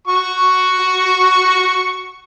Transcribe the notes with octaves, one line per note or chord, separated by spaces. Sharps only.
F#4 C#6